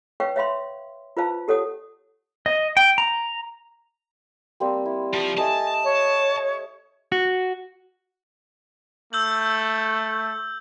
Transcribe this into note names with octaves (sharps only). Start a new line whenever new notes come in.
B4 C#5 F5 G5 C#6
C#5 E5 F5 B5 C6
F4 B4 C5 F5 A5
G4 A4 C#5 F#5 D#6
D#5
G5
A#5
G3 A#3 C4
E4
F3 G4 C#6
A3 D#5 E5 G#5 A5
C#5
F#4
A3 E6 G6 F#7